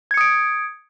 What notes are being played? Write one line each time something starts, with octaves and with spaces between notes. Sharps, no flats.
D#6 G#6 C#7 D7